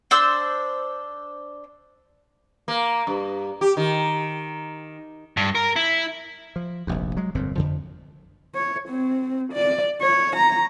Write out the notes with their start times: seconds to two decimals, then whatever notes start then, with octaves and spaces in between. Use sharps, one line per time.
0.11 D4 C5 E6
2.68 A#3
3.07 G2
3.61 G4
3.77 D#3
5.37 G2
5.55 A#4
5.76 E4
6.56 F3
6.87 F1 A#1 D#2
7.17 F#3 G#3
7.35 G1 F2 A#2 C4
7.56 F2 D3 F3
8.55 C#5
8.89 C4
9.53 D5
10.02 C#5
10.36 A#5